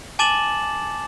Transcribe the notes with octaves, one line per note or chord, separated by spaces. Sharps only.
G#5 A5 D6 A6 E7 F#7